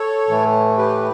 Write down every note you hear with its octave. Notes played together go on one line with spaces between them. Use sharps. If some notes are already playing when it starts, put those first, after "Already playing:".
Already playing: A4 C#5
A2 E3 A3
G4 B4